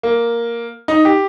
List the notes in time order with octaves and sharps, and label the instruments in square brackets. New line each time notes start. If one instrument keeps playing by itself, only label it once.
[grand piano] A#3
D#4
G4